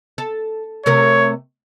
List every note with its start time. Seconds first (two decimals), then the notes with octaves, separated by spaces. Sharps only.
0.18 A4
0.86 C3 A3 A#4 C#5